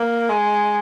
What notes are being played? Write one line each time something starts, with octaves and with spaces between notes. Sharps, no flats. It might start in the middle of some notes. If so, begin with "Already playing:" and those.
Already playing: A#3
G#3